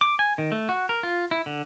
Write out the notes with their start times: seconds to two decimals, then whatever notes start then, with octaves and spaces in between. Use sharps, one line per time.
0.01 D6
0.19 G#5
0.38 D#3
0.52 A3
0.69 F#4
0.89 A#4
1.03 F4
1.31 E4
1.46 D3